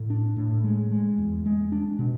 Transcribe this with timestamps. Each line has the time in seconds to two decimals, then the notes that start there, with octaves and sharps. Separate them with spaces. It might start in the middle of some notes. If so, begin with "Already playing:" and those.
Already playing: A2
0.10 D4
0.36 A2
0.64 G#3
0.91 G#3
1.18 E2
1.46 G#3
1.72 D4
1.99 B2